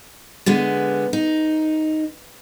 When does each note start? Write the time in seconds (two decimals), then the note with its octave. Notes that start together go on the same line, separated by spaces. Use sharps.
0.46 D3 G#3 B3
1.13 D#4